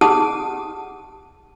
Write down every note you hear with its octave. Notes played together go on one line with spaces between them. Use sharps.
G4 G#4 F#5 A5 D#6